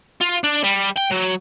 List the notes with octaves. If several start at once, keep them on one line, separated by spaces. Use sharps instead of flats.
F4
D4
G3
G5
F#3